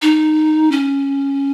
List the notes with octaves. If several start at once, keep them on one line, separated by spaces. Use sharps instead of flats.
D#4
C#4